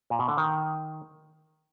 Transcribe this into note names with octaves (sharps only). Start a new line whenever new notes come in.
A#2
B2
D3
D#3